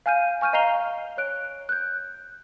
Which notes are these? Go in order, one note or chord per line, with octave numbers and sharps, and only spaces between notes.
F5 G#5 F6 G6 D#7
G#5 C#6 F6 G6 D#7
D#5 F5 A#5 C7 F7 G7
C#5 F#6 D7
F#6 G6